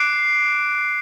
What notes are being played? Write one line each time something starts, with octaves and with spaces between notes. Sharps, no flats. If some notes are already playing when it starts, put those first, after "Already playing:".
Already playing: D6 F#6 C7 D7